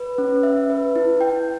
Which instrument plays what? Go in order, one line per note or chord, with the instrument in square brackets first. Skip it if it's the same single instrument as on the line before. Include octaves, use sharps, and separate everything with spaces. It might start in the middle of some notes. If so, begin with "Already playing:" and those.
Already playing: [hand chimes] B4
C#4
E5
B4
E4
G5